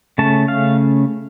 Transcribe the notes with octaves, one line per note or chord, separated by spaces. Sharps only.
C#3 A3 C#4 A5
F5